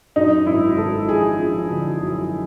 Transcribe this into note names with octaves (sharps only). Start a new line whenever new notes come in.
F#2 D#4
G#1 E4
G#1 A4
F3 G#4
F3
D3
F#2